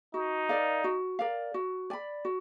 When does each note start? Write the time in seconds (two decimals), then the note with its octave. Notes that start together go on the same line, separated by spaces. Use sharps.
0.14 D#4 F#4
0.49 A#4 D5 F5
0.84 F#4
1.19 A#4 D5 F5
1.54 F#4
1.90 D5 G#5 B5
2.25 F#4